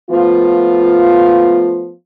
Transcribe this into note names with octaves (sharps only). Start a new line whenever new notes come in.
F3 A3 B3 F4